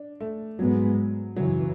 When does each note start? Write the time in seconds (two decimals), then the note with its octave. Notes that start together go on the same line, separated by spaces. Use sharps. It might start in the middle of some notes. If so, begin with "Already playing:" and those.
Already playing: D4
0.20 A3
0.59 G#2 F#3 G#3 B3
1.36 F#2 C#3 E3 F#3